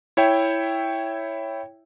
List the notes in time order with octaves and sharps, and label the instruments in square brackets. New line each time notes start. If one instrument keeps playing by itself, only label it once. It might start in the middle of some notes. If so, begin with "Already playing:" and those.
[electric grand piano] E4 C#5 E5 G5